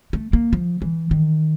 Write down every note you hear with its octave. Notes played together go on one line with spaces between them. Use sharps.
A3
A#3
F3
E3
D#3